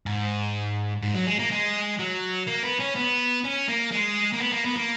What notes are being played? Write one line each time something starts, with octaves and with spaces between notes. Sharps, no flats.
G#2
G#2
F#3
G#3
A#3
G#3
F#3
A#3
B3
C#4
B3
C#4
A#3
G#3
A#3
B3
A#3
B3
A#3